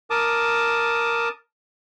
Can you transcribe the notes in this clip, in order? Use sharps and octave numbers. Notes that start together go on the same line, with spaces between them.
A#4 A5 D6 D#6